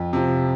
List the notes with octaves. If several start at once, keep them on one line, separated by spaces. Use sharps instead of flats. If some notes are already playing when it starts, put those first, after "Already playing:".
Already playing: F2
C3 F3